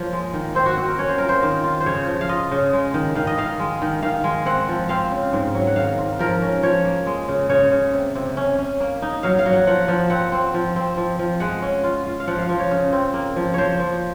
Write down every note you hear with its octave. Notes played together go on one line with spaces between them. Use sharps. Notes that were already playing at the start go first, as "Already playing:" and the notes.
Already playing: F3 A#3 C#5
G#3
D#3
C4 C5
F#4
C4 F#4
A#4
C#4 C#5
C5
F4 A#4
C5
D#3
F4
C5
C#3 C#5
F3
F5
F4 D#5
C#3
G#3
D#3
D#3 F5
D#5
D#3 F5
G#3
D#3
D#3 F5
G#3
C4 F#5
F3
C4 F5
C#3
G#2
F#3
F#5
D#3 F5
G#2
F3 A#4
C#4
F3 C#5
A#3
G#3
C#3
C#3 C#5
C#3
C3
C3
C#4
C#4
A#3
D#4
F#3 F5
F5
F#3
F#5
F3 F#5
F3
C4 F#5
C4
F3
C4
F3
F3
G#3 F#5
C#4
F4
F4
F5
F3 F#5
F5
F3
C#5
C#3
C4
A#3
F3
F3 C5 C#5
F3